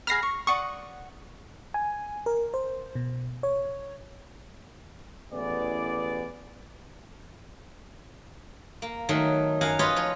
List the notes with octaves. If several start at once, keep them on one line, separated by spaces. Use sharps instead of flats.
G#4 F#5 B5 F6 A#6 C7
C#6
D5 F#5 C#6 D#6
G#5
A#4
C5
B2
C#5
A1 E3 B3 G#4 D5
A#3
D#3 F#3 A3
F#2 F5 F#5 G#5 A#5
F4 F#4 B4 C#5 D#5
F3 C#5